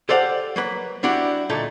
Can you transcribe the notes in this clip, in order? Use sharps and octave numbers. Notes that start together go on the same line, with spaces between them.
G4 A4 C5 D5 F5 F#5
F#3 A#3 B4
G3 D4 E4 F#4 G4
D2 A#2 A3 D#4 A4